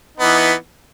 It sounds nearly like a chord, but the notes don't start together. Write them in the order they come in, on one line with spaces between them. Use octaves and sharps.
D#4 B3 E3